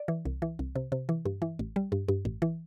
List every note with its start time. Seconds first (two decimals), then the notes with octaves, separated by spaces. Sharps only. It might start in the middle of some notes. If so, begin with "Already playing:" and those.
Already playing: D5
0.08 E3
0.25 C2
0.42 E3
0.59 C2
0.76 C3
0.92 C3
1.09 E3
1.25 G2
1.42 E3
1.59 A1
1.76 G3
1.92 G2
2.08 G2
2.25 A1
2.42 E3